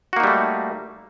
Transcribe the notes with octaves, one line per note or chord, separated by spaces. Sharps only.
G3 A3 A#3 D#4 F#4